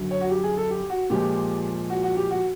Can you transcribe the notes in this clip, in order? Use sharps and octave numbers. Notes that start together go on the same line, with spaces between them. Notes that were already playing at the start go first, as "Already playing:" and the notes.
Already playing: F#2 D3 F#3
C#5
F#4
G4
G#4
A4
G4
F#4
A#2 F3 G#3 G4
F#4
F#4
G4
F#4